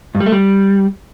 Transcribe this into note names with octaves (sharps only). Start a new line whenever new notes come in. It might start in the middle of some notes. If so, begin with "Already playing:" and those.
G2
G3
A3
G3